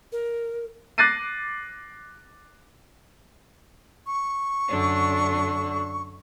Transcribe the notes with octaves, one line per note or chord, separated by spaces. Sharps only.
A#4
D6 F#6 A6 A#6 C7 D#7
C#6
F#2 D3 D4